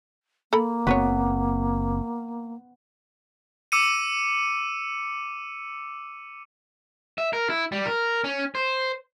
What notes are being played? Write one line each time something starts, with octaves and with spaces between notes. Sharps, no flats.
A#3 A4 A#5 B5
F#1 B3 C4 F#4 B4 C#5
D6 E6 C#7 D#7
E5
A#4
E4
G3
A#4
C#4
C5